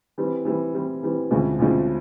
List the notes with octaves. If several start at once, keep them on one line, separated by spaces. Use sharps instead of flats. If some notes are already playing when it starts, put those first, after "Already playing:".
E3 G3 C4
E3 G3 C4
E3 G3 C4
E3 G3 C4
D2 C#3 F3 G#3 C4
D2 C#3 F3 G#3 C4